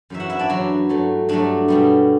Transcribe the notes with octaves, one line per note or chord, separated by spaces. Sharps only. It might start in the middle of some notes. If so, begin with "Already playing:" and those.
F#2 C#3 E3 E5
F#4 F#5
E4 E5
D4 D5
F#2 C#3 E3 F#3 F#4
G2 F#3 A3
G2 F#3 A3 D4
B2 G3 B3